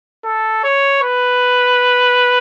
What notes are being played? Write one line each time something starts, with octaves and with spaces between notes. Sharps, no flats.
A4
C#5
B4